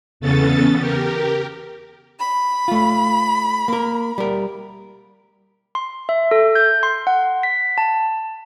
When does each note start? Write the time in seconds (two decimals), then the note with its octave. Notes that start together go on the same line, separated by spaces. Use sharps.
0.20 E2 C#3 B3 C#4 A4 A6
0.78 G4 A#4
2.18 B5
2.68 A3 F4
3.68 A#3 A#4
4.18 G3 A#4
5.75 C6
6.09 E5
6.31 A4
6.55 G6
6.83 C6
7.07 F#5
7.43 B6
7.78 A5